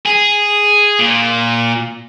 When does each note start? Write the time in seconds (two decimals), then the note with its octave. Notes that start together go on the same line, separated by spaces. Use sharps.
0.05 G#4
0.99 A#2